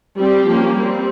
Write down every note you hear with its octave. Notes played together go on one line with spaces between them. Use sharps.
G3 C4 G4
F3 A#3 C#4
G3 C4